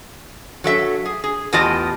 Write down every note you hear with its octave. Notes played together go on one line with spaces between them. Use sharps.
F#3 A4 E5
G#4
G#4
E2 A2 F4 G4 D#5 A5